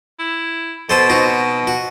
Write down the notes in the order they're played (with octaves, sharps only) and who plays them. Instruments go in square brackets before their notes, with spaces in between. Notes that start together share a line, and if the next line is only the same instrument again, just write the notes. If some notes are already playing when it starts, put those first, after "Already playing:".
[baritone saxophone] E4
[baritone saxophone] B2 [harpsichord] A4 C5 A5
[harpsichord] C4 D#4 F#4
F#4